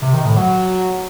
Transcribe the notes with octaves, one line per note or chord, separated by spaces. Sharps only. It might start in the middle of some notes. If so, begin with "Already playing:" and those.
C3
D#3
A2
F#3